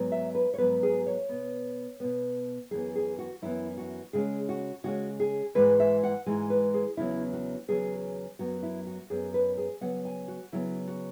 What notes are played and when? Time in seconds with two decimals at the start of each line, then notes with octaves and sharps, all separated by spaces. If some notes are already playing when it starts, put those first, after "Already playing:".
Already playing: G#2 F#3 B3
0.12 E5
0.35 B4
0.54 C#5
0.58 G#2 F#3 B3 B4
0.83 G#4
1.06 C#5
1.29 B2 B3
2.00 B2 B3
2.71 F#2 E3 B3 G#4
2.96 G#4
3.19 F#4
3.42 F#2 E3 B3 E4
3.78 F#4
4.13 C#3 G#3 C#4 G#4
4.49 F#4
4.84 C#3 G#3 C#4 F#4
5.20 G#4
5.55 G#2 E3 G#3 B4
5.80 E5
6.03 F#5
6.26 G#2 E3 G#3 G#5
6.50 B4
6.74 G#4
6.97 E2 C#3 F#3 B3 E4
7.33 F#4
7.68 E2 C#3 F#3 B3 G#4
8.39 F#2 F#3 B3 F#4
8.63 E4
8.87 F#4
9.10 F#2 F#3 B3 G#4
9.34 B4
9.57 G#4
9.81 C#3 F#3 B3 F#5
10.05 G#5
10.28 F#4
10.52 C#3 F#3 B3 E4
10.88 F#4